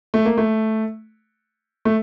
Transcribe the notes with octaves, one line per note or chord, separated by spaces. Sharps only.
A3
A#3
A3
A3